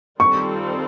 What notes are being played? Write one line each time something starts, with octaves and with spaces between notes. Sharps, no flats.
D#3 G3 C4 F4 A4 C#6